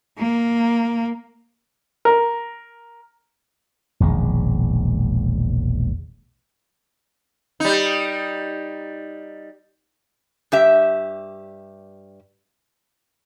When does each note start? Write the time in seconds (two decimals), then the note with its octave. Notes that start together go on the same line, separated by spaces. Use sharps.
0.18 A#3
2.05 A#4
4.00 E1 A#1 D#3 G#3
7.60 G3 D#4
10.52 G2 G4 E5